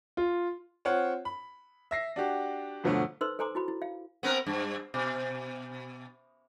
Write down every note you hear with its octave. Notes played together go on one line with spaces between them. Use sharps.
F4
C4 F4 C#5 F#5
B5
E5 A#6 C7
D4 F#4 G4
G2 B2 D3 F3 F#3 A3
D#4 A4 B4 C5 C6 E6
A4 C5 G#5 A#5 C6 D6
E4 F#4 B5
E4
F5
B3 C4 A#4
G2
B2